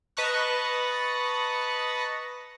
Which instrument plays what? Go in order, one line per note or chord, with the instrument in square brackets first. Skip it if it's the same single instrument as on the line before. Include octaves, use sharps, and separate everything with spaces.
[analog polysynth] B4 D#5 A5 A#5 C#6 F#6